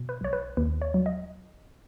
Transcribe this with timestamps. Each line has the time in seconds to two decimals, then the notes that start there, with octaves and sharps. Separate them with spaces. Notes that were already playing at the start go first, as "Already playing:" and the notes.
Already playing: B2
0.09 B4
0.21 B1 C#5
0.33 B4
0.57 D#2 B4
0.82 C#5
0.94 F#3
1.06 D#5